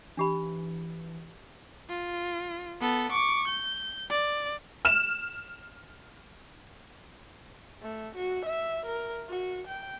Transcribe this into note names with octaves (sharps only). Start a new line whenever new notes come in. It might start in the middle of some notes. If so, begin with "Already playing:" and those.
E3 D4 G4 B5
F4
B3 A4
C#6 D6
G6
D5
F6 E7
A3
F#4
E5
A#4
F#4
G5